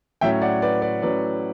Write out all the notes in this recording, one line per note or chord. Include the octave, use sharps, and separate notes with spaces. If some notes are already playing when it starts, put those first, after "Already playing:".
A2 F#3 C#4 E5 G5
D5 F#5
B4 D5
B4 D5
A2 F#3 C#4 B4 D5